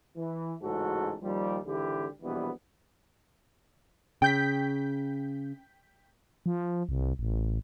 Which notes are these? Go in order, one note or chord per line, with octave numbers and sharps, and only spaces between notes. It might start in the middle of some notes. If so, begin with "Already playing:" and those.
E3
A1 G#2 C#3 F#4 A4
D#2 F3 G3
G#1 D3 E3 G4
A#1 B2 E3 G3 B3
C#3 G5 G6 B6
F3
C2
A1